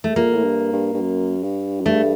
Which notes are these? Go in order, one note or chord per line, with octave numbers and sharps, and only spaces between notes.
A3
A#2 A#3
A2
G2
G2
G2
F#2
G2
F#2
G2 A3